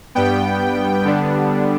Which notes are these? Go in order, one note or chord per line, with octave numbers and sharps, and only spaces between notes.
G2 G3 B3 G5
D3 G3 B3 D4